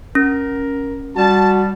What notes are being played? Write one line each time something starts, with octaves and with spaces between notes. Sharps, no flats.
C#4 A#4
G3 F#4 A5